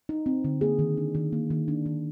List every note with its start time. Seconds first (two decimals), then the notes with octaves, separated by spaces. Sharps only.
0.09 D#4
0.26 C4
0.44 D3
0.61 A#3 G#4
0.79 D#3
0.97 D4
1.15 D#3
1.32 A#3
1.50 D#3
1.68 D4
1.86 D#3